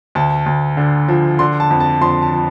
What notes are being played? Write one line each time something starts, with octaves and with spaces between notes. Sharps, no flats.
D2 A5
D2
D3
F3
D3 C6
A5
F2
A5
F2 C6
A5
F3